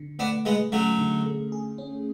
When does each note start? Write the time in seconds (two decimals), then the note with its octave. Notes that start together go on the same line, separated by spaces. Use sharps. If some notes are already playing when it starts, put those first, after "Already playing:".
Already playing: D3
0.19 A3 B3 D4
0.45 G#3 B3 G#4
0.72 F#3 A3 C#4
0.99 D3
1.26 A3
1.52 G#4
1.78 C#4